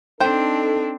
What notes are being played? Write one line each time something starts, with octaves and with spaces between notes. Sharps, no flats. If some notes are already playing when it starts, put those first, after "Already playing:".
C4 D4 D#4 A4 C5 G5